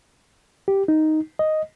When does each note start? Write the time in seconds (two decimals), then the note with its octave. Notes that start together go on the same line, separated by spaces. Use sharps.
0.68 G4
0.88 D#4
1.39 D#5